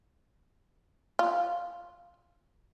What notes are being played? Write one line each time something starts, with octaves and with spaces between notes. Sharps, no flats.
F4